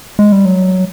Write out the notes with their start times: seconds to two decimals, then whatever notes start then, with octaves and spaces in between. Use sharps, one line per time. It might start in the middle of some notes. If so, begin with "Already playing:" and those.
0.19 G#3
0.32 G3
0.45 F#3